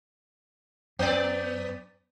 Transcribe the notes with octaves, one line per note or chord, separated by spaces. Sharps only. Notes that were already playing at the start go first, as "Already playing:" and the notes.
F#2 B3 D5